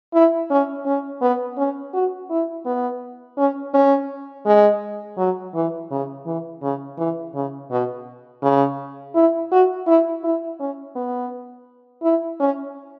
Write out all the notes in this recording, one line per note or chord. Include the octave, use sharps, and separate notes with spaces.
E4
C#4
C#4
B3
C#4
F#4
E4
B3
C#4
C#4
G#3
F#3
E3
C#3
E3
C#3
E3
C#3
B2
C#3
E4
F#4
E4
E4
C#4
B3
E4
C#4